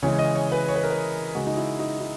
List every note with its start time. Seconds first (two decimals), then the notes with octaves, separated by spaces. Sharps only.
0.02 C#3 E3 G#3 C#5
0.19 D#5
0.35 C#5
0.52 B4
0.68 C#5
0.75 B4
0.84 A#4
0.90 B4
1.35 C#3 G#3 F#4
1.47 D#4
1.57 E4
1.79 D#4
2.00 D#4